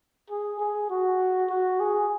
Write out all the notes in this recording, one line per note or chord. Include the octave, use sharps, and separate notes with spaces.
G#4
G#4
F#4
F#4
G#4